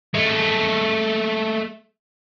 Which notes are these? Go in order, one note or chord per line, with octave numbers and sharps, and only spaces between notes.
G#3 A3